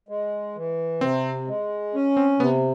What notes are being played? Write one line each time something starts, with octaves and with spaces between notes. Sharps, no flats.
G#3
E3
C3 C4
G#3
C#4
C4
C3 B3